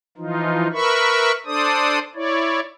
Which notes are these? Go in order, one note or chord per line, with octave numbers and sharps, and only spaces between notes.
E3 F3 D#4 F4
A#4 B4 E5 B5 C#6
D4 A4 C5 D5 D#6
E4 C#5 D5